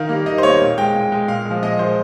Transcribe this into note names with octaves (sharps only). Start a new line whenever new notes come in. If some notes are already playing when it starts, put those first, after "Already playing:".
Already playing: D#3 F5
G3 A#3
D#3 D#5
C5
G3 A#3 C#5
A#2
G#3 G5
A#2
G#3
A#2 F5
G#3
F3
A#2 D#5
F3 G#3 C5